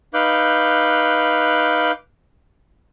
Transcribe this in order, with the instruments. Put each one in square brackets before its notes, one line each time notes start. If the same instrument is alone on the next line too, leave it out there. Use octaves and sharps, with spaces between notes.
[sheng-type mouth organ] D#4 B4 F5 D6 F#6 G6